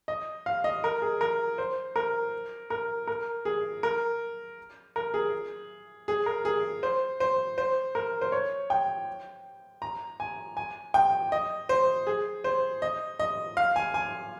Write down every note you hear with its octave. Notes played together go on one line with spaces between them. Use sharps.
D#5
F5
D#5
A#4
G#4
A#4
C5
A#4
A#4
A#4
G#4
A#4
A#4
G#4
G#4
A#4
G#4
C5
C5
C5
A#4
C5
C#5
G5
A#5
G#5
G#5
G5
D#5
C5
G#4
C5
D#5
D#5
F5
G#5
G#5